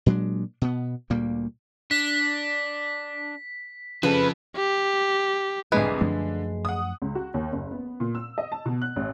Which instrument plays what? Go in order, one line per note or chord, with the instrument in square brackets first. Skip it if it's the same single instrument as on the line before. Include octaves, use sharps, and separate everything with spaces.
[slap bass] A#2 F#3 G#3 D4
B2 B3
D2 A#2 G3 A#3
[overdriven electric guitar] D4 [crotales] B6
[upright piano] C#3 [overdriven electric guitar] F3 A4 [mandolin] B4
[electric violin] G4
[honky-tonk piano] C2 F2 D3 [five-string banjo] G#3 G#4 B4
[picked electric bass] F#2 F3 A3 [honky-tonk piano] D3
[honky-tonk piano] F#5 D#6
C#2
F#4
D#2
F#1
B3
A#2
E6
D#5
A5
B2
F#6
A1